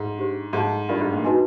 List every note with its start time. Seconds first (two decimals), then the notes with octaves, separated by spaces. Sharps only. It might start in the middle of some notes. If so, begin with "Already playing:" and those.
Already playing: G#2
0.17 D4 G4 C5
0.53 G#2 C5 F5 A5
0.89 G2 D4 F4 A#4 D5
1.01 G#2
1.13 A#2
1.25 D#4 F#4 B4 D#5 G#5